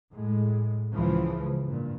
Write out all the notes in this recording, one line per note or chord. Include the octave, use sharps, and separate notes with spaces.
A2 G#3
C#2 C#3 E3 F3
G2 A#2